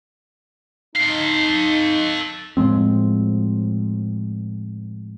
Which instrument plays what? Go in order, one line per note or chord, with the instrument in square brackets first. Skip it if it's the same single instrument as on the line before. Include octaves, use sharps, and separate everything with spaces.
[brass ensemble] D#4 [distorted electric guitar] A4 F5
[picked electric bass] A2 F3 G#3 C4